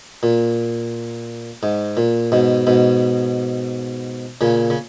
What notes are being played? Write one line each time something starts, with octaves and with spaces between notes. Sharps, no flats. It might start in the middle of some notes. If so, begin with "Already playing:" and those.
A#2
G#2
A#2
G#2 B2
G#2 B2
A#2 C#3
C#3